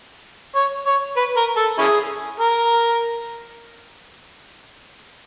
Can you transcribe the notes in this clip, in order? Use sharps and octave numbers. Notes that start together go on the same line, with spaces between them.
C#5
C#5
B4
A#4
A4
C#4 E4 G#4
A#4